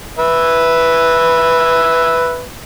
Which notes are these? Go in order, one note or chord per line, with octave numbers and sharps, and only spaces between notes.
B4 E5